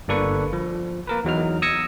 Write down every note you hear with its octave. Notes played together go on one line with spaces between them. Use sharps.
G1 A#3 D4 A4 B4 C#6
F3
A#3 A#4 B4
E2 F#3 D#4 F6
D#6 E6 G#6 A#6 C#7